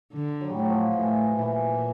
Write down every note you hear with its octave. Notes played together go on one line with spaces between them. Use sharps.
D3
F#3
G3
A2 F#3
F3
A2 E3
A#2 E3